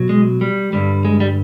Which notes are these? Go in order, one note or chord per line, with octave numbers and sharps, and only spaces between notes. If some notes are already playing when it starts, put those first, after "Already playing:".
Already playing: B2 F#3
G#3
G3
G2 D3 G3
G#3
G3